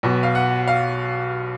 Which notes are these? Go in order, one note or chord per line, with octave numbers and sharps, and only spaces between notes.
B1 B2
F5
F#5
F5